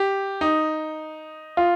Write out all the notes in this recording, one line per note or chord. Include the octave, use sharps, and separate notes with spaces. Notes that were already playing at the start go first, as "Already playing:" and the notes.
Already playing: G4
D#4
F4